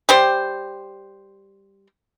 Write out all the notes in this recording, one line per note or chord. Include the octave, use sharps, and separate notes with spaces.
G3 G4 C5